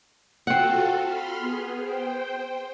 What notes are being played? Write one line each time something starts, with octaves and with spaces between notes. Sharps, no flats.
C4 F4 F#4 A4 F#5
B5 C6 F6
B3 G#4
C5 G5